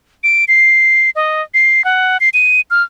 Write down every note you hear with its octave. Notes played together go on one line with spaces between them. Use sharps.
D7
C7
D#5
C7
F#5
C7
D#7
F6